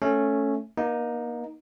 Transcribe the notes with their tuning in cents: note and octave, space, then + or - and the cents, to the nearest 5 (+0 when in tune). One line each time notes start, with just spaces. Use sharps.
A3 +0 C#4 +0
A#3 +35 D#4 -5